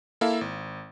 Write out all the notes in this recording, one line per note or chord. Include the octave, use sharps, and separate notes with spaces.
A#3 E4 A4 F5
G#1